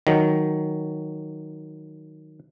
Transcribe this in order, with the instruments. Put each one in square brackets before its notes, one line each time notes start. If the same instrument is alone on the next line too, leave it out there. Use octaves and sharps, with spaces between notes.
[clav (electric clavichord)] D#3 F#3